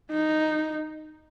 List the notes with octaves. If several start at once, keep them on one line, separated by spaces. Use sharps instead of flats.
D#4